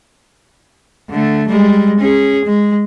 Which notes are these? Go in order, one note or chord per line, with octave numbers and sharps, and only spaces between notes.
D3 A3
G3 G#3
C#4 G#4
G#3